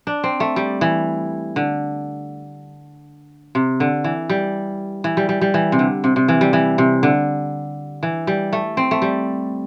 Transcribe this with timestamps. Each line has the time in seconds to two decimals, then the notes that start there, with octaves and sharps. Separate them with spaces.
0.07 D4
0.24 C4
0.40 A3
0.56 G3
0.81 E3
1.56 D3
3.55 C3
3.80 D3
4.04 E3
4.30 G3
5.04 E3
5.17 G3
5.29 G3
5.41 G3
5.54 E3
5.72 C3
5.79 D3
6.04 C3
6.16 C3
6.28 E3
6.41 G3
6.53 E3
6.78 C3
7.03 D3
8.03 E3
8.27 G3
8.53 A3
8.77 C4
8.91 A3
9.02 G3